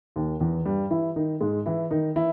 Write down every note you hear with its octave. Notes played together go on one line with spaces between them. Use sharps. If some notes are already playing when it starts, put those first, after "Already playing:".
D#2 D#3
E2 E3
G2 G3
E3 E4
D#3 D#4
G#2 G#3
E3 E4
D#3 D#4
E3 E4